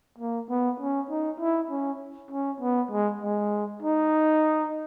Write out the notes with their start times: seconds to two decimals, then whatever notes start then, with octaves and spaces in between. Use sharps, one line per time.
0.18 A#3
0.49 B3
0.80 C#4
1.10 D#4
1.40 E4
1.70 C#4
2.31 C#4
2.61 B3
2.91 G#3
3.22 G#3
3.82 D#4